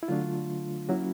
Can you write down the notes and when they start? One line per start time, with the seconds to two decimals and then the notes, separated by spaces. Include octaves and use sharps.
0.03 E4
0.08 D3 F#3 A3 D4 F4
0.89 F#3 A#3 C#4 E4 F#4